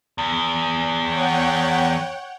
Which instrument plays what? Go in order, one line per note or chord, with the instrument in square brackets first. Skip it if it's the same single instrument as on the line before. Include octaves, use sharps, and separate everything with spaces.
[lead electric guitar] E2
[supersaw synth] C#5 F#5 G5